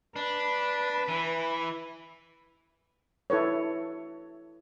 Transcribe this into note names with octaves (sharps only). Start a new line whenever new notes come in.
D4 B4
E3
E4 A4 B4 C#5